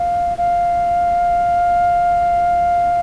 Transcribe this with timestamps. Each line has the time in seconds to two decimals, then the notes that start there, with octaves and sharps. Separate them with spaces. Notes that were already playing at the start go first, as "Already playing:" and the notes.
Already playing: F5
0.38 F5